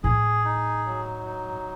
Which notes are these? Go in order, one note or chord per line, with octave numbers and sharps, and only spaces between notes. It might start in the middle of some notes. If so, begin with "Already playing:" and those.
A2 G#4
D#4
F#3
D#4